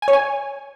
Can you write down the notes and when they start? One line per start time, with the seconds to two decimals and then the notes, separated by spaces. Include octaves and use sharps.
0.02 G#5
0.08 C#5
0.13 G#5